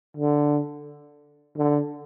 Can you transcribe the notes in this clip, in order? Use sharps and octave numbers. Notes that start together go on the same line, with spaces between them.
D3
D3